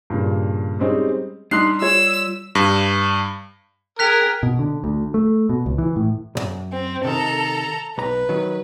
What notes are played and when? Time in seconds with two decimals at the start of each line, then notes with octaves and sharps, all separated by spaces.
0.10 G2 A#2 C#3
0.79 G3 G#3 C4 C#4 D#4
1.51 G3 D4 D#4 C6 F#6 C7
1.82 F4 C#5 E6
2.55 G2
3.99 G#4 A#4 G5 F#6 B6 F7
4.43 B2
4.59 D3
4.84 D2
5.14 A3
5.49 B2
5.66 C#2
5.78 E3
5.96 A2
6.35 B1 F#2
6.72 C4
7.05 C3 D#3 A4 A#5
7.98 B1 B4 A#5
8.29 D#3 F#3